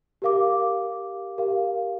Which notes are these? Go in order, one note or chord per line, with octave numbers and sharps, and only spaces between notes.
G4 A#4 F5 D6
G4 A#4 F5